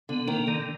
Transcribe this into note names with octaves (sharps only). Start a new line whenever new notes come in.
D3 B3
D#3 A#3
D3 D#3